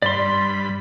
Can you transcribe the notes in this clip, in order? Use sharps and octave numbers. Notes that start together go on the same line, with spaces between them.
G2 D5 B5 C6